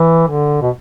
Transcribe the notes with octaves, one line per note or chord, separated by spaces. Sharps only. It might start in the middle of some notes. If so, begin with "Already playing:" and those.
Already playing: E3
D3
B2